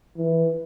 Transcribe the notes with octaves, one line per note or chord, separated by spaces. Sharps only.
E3